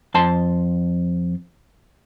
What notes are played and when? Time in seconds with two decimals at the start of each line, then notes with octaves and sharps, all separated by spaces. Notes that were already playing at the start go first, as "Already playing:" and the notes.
0.14 F2 A5 C6